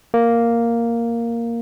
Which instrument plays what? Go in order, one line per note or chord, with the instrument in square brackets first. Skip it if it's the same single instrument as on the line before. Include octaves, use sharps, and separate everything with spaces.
[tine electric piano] A#3